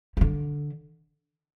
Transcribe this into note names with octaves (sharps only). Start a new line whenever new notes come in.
F3
D3